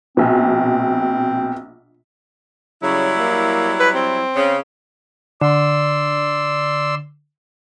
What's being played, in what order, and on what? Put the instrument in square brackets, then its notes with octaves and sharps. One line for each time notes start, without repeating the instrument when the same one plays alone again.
[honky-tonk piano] A#1 B2 [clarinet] C4
[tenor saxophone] C#3 [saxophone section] F#3 G3 E4
[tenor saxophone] A#3
B4
C4
[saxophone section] C#3
[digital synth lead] D3 [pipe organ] D5 C6 E6